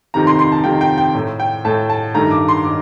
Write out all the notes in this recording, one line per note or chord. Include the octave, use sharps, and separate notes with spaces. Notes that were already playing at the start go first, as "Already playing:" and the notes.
F2 C3 D#3 A#5
C6
C6
A5
F2 C3 D#3 G5
G5
G5
A2 A3
G5
A2 A3 A5
A5
G2 D#3 A3 A#5
D6
C6
D#3 D6